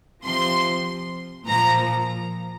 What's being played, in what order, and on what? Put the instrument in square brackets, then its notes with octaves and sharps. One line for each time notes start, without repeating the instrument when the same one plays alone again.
[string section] C3 F3 C6
A#2 F3 A#5